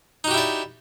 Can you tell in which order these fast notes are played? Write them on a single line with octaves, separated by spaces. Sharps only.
D#4 F#4 G4 E4 D5